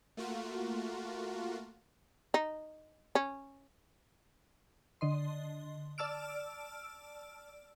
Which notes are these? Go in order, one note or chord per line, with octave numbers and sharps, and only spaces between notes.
A3 A#3 F4 F#4
D#4
C#4
D3 D#5 C6
D5 A5 E6 F6 D7